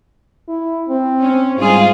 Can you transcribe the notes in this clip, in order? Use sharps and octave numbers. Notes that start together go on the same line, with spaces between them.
E4
C4
C#4
G#2 G3 F4 G#4